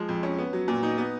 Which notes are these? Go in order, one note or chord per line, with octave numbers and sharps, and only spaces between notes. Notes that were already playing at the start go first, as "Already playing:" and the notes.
Already playing: F3 G#3
F2
C#4
B3
F#3
A#2
D#4
B3